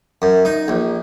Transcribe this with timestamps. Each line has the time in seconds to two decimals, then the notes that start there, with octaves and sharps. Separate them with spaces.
0.22 F#2
0.45 D#4
0.68 A#1